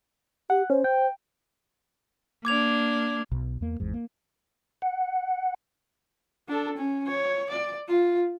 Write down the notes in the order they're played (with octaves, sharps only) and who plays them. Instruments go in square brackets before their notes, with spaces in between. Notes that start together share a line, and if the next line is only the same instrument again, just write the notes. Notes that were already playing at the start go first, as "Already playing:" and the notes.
[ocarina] G4 [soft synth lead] F#5
[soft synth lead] C#4 [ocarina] C5
[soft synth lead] G5
[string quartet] A#3 D4 [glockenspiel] D6 G#6 F7
[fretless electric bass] B1 B2
E2 A#3
G#1 E2 G#2
A#3
[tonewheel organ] F#5
[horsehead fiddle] D4 A4
C#4
C#5
D5
F4